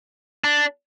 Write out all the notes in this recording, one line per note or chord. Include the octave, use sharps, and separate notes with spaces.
D4